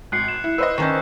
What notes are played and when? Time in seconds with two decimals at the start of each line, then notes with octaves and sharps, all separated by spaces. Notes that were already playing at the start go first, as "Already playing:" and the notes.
0.12 G#1 F#6 C7 C#7
0.27 C7 E7
0.44 E4
0.58 B4 C5 D#5 E6 F#6 E7
0.78 D#3 C#4 D4 C#6 G6